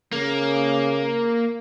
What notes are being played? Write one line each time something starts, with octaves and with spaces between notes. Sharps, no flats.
C#3 A#3